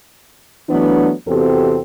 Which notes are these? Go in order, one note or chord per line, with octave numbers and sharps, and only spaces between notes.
E3 F#3 A3 B3 D4
E2 C3 C4 F#4 G4 A4